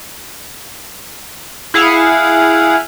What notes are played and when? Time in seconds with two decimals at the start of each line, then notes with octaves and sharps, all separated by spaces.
1.74 E4 G#4 F5 F#5